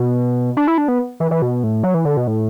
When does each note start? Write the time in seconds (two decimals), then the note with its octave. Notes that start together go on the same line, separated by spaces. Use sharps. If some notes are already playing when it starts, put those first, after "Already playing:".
Already playing: B2
0.57 D4
0.67 E4
0.78 D4
0.88 B3
1.20 E3
1.31 E3
1.42 B2
1.64 A2
1.83 F#3
1.94 E3
2.05 D3
2.17 B2
2.27 A2